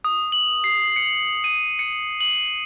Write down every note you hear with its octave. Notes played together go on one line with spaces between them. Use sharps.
D#6
F#7
C7
C#7
D#7
C#7
F#7